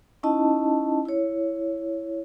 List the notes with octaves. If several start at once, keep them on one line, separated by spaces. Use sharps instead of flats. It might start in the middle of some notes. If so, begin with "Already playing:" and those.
C#4 D#4 E4 D#5 A5
E4 C#5